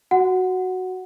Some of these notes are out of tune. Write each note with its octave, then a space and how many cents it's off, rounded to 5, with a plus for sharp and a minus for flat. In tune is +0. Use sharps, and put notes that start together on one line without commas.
F#4 +0 F#5 +0